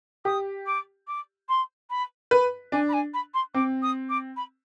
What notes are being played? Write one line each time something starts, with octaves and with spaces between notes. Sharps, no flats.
G4 D#6
D6
D6
C6
B5
B4
D4 G#5
B5
G#5
B5
C6
C4 D6
D#6
D6
B5